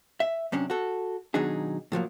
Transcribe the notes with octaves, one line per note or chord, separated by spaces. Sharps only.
E5
F#2 C3 C#4 D4
F#4 A4
B2 D#3 F#3 D4 D#4 G#4
A2 F3 F#3 A#3